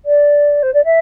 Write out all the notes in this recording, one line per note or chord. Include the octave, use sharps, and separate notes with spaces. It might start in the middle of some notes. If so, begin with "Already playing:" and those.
D5
C5
D5
E5